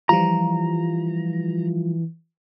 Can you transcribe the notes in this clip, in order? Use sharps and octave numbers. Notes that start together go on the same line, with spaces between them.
E3 F3 G3 F4 A#5